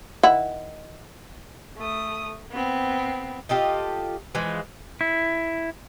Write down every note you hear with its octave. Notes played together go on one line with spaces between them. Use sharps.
D#3 E4 F#5
A3 D#6
B3 C4
F4 G4 A4 D#5
E3 F3 G#3
E4